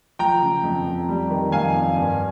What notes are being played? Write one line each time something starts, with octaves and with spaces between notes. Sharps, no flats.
F3 G5 A#5
C#3
F2
F2
G3
D#3
F2 F5 G#5
F2
G2